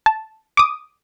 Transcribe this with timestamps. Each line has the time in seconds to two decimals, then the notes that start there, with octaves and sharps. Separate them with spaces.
0.06 A5
0.57 D6 D#6